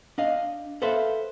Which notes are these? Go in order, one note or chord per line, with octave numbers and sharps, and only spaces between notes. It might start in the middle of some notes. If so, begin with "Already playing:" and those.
D4 D#5 F5
A4 B4 C5 E5 F5